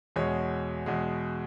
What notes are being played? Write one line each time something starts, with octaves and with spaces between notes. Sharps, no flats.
E2 B2 G#3 C#5
E2 B2 G#3